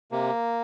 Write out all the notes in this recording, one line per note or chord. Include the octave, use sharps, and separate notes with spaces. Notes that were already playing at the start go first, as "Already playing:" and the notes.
C3 A#3